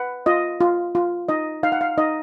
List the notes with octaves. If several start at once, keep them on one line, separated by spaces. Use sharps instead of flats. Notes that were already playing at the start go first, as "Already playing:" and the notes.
Already playing: B4 F#5
F4 D#5
F4
F4
D#4 D#5
D#4 F5
F#5
F5
D#4 D#5